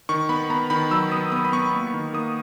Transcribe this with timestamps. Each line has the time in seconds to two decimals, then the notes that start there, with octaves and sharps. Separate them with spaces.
0.09 D#3 C#6
0.29 B3 B5
0.50 B3 A#5
0.70 D#3 B5
0.91 F#3 E6
1.12 B3 D#6
1.32 B3 D#6
1.45 B5
1.53 B3 C#6
1.73 A#3
1.94 D#3
2.13 A#3 D#6